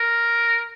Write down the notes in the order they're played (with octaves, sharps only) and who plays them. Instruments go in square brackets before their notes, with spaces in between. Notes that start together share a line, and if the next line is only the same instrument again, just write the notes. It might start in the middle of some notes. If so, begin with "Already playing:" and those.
Already playing: [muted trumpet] A#4